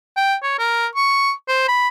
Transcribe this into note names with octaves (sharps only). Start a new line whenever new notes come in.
G5
C#5
A#4
C#6
C5
B5